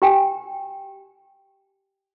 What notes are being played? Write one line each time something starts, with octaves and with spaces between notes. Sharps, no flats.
G4 G5 G#5